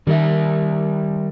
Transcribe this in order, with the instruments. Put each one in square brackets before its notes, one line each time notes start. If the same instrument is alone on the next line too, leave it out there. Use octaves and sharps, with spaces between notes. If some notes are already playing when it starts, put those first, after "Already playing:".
[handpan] D#3 [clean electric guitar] G3 A#4 E5